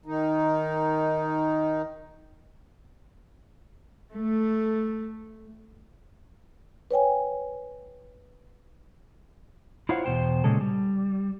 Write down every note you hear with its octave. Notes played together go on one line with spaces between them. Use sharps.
D#3 D#4
A3
B4 C#5 G5 G#5
E4 F4 C5 C#5 F5 F#5
E2 B2 C5 G5
A#2 C#3 G#3 C#4 A4
G3